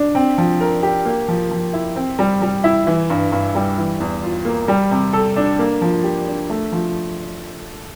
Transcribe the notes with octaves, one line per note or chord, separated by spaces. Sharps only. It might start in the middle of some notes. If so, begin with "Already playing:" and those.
Already playing: D4
C4
F3
A#4
G4
A#3
F3
F3
E4
C4
G3
G3
E4
E3
G2
G2
G3
E3
E2
F4
A#3
G3
C3
A4
D4
A#3
F3
G4
D4
A3
F3